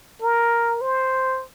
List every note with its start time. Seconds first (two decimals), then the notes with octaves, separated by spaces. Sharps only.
0.22 A#4
0.81 C5